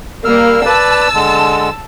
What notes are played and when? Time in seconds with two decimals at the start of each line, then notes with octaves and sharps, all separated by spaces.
0.25 G3 A#3 E6 F6
0.65 B4 D5 A5 E6
1.14 D3 G#3